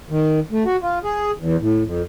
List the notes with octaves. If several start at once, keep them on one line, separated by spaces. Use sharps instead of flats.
D#3
A3
F#4
F4
G#4
E2
A2
F2